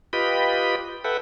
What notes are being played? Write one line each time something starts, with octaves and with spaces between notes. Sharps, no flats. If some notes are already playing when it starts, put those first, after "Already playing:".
F4 G4 B4 D#5 G5 B5
A4 B4 E5 F#5 G5